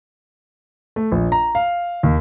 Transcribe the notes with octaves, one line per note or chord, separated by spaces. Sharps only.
A3
A#1
A#5
F5
D#2